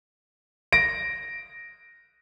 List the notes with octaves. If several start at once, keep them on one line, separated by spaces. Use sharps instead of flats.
A#6 D7